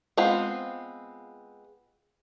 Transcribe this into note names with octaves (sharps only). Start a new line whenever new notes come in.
G#3 B3 C4 F4 B5